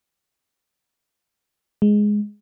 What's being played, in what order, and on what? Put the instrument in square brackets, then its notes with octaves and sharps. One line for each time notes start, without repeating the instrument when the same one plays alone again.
[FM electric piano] G#3